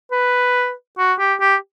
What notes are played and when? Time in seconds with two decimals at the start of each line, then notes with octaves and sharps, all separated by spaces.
0.11 B4
0.98 F#4
1.19 G4
1.40 G4